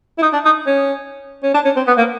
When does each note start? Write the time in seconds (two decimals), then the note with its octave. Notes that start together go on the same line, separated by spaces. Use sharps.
0.18 E4
0.22 D#4
0.33 D4
0.45 D#4
0.67 C#4
1.43 C#4
1.54 D4
1.65 C#4
1.76 C4
1.87 B3
1.97 A#3